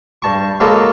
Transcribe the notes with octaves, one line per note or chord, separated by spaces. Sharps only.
G2 A5 C#6
C#3 F#3 G#3 A#3 A4